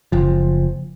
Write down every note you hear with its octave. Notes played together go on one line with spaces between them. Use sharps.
F#1 F3